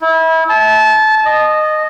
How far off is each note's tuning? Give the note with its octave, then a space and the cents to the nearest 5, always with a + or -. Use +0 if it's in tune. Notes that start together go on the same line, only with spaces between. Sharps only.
E4 -30
A5 -25
D#5 -15